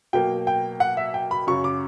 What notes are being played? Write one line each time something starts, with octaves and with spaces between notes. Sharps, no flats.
B2 F#3 A#3 G5
G5
F#5
E5
G5
B5
F#2 C#3 F#3 C#6
D6